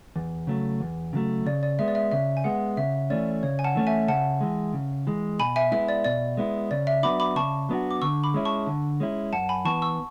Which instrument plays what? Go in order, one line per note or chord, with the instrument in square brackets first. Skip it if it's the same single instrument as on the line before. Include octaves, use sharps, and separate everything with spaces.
[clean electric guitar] E2
C#3 F#3 A3
E2
C#3 F#3 A3
[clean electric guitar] C#3 [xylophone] D5
[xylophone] D5
[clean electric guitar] G#3 B3 [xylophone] E5
[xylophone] D5
E5
[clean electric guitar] C#3 [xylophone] E5
[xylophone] G#5
[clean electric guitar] G#3 B3 [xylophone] F#5
[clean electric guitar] C#3 [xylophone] E5
[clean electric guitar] E3 A3 C#4 [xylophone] D5
[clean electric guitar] C#3 [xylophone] C#5
[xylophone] G#5
F#5 A5
[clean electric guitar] E3 A3 C#4
[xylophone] E5 G#5
[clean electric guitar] C#3 [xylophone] F#5 A5
[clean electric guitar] E3 G#3
C#3
E3 G#3
[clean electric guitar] B2 [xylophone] G#5 B5
[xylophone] E5 G#5
[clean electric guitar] G#3 B3 E4 [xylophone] E5
[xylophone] D5
[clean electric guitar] B2 [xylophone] D5
[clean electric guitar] G#3 B3 E4
[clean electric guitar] C#3 [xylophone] D5
[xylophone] E5
[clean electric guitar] F#3 B3 D4 F#4 [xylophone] B5 D6
[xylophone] B5 D6
[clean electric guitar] C#3 [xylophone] A5 C#6
[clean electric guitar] F#3 B3 D4 F#4
[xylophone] D6
[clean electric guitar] D3 [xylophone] C#6 E6
[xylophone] B5 D6
[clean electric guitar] G#3 C#4 E4
[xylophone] A5 C#6
[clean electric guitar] D3
G#3 C#4 E4
[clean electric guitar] F#2 [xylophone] F#5 A5
[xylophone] G#5 B5
[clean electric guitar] E3 B3 [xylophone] A5 C#6
[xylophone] C#6 E6